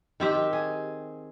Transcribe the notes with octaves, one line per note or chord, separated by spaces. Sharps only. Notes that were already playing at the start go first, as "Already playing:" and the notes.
D#3 C4 G4
G#4